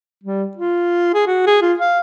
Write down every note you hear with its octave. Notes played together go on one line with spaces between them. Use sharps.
G3
F4
G#4
F#4
G#4
F4
F5